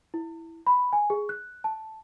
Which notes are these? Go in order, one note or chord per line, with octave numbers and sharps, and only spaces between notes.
E4
B5
G#5
G#4
F#6
A5